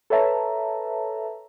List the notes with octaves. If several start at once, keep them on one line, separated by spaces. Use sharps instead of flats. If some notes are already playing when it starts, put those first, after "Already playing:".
A4 B4 C#5 E5 A5 A#5